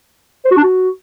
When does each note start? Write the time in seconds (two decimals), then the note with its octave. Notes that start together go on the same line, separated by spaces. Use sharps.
0.45 C5
0.51 F#4
0.57 D4
0.63 F#4